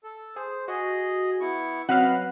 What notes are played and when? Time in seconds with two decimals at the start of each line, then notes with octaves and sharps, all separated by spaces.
0.04 A4
0.36 G#4 C5
0.68 F#4 G#4 D#5
1.40 B3 E4 C#6
1.89 F#3 C4 B4 D#5 F5 F#5